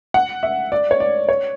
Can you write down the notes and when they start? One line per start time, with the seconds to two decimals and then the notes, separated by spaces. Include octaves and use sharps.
0.14 F#5
0.43 E5
0.72 D5
0.91 C#5
1.00 D5
1.29 C#5